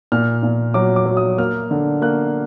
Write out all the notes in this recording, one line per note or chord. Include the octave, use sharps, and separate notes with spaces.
A#2 F6
A#2
F#3 D6
D6
F#3
D#6
A#3 F6
D3
A#3 F#6